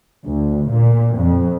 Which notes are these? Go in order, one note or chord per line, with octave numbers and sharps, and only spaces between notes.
D2
A#2
F2